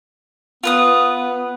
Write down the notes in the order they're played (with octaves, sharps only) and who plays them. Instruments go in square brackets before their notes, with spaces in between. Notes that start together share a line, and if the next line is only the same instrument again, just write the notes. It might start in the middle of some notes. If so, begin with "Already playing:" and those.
[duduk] B3 [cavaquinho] F4 B4 D#6